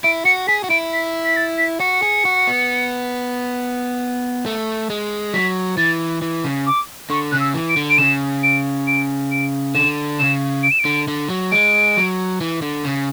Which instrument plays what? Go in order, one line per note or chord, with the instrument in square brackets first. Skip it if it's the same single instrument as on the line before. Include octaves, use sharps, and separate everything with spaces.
[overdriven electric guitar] E4 [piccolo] D7
[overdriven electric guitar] F#4 [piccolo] C#7
[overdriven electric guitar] G#4 [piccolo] B6
[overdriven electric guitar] F#4
[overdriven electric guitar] E4 [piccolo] D7
[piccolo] B6
B6
A6
B6
[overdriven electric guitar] F#4 [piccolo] C#7
[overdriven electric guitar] G#4
F#4
B3
A3
G#3
[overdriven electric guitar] F#3 [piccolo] B6
[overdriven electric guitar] E3 [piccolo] A6
[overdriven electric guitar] E3
C#3
[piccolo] D6
[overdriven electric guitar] D3 [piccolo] C#6
[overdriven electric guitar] C#3 [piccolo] F#6
[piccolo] E6
[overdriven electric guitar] E3
[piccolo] D7
[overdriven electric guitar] D3
[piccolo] D7
[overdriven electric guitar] C#3 [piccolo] E7
[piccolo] D7
D7
D7
[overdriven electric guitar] D3 [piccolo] E7
[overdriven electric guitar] C#3 [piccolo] E7
[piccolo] D7
E7
D7
[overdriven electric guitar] D3
D3
F#3
[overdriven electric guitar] G#3 [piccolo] D7
[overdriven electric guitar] F#3
E3
D3
C#3